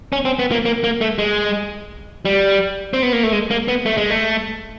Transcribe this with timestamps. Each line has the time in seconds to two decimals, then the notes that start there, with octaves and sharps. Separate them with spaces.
0.13 C#4
0.25 C4
0.39 B3
0.52 A#3
0.65 A#3
0.84 A#3
1.01 A3
1.19 G#3
2.25 G3
2.93 C4
3.03 B3
3.13 A#3
3.23 A3
3.33 G#3
3.51 A#3
3.68 B3
3.86 A3
3.97 G#3
4.10 A3